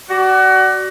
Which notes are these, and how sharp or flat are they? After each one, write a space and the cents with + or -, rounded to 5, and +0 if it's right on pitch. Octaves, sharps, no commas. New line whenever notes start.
F#4 +30 D5 +0